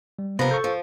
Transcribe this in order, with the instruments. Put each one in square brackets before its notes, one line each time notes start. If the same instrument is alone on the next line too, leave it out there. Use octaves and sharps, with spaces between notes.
[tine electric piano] G3
[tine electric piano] C3 B5 A#6 [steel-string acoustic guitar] F3 A#4 [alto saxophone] B3
[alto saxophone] A4 [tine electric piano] C#6 G6
[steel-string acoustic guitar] F3